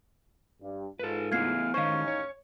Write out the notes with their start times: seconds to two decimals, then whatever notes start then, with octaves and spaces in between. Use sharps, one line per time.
0.61 G2
0.99 G#2 F4 A4 B4
1.32 A3 B3 E4 F5 G#6 C7
1.74 A1 D#2 D#3 C#4 D#4 C5 F5 C#6
2.08 C#5